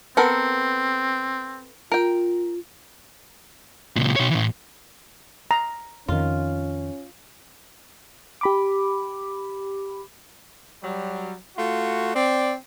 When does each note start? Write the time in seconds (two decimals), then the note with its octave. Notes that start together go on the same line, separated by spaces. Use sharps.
0.17 B3 C4 A4 A#4
1.92 F4 A#4 G5
3.96 C#2 A#2
4.16 B2 C#5
4.31 A2 E3
5.51 A#5
6.08 F2 D#3 C#4 F4
8.41 G4 B5 D6
10.82 F#3 G3
11.57 A3 F4 F#4
12.14 C4 D5